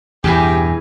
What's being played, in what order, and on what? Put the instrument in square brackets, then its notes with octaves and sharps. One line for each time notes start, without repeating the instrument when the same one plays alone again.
[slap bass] E2 G2 B2 [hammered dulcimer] E3 G#4 [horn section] G4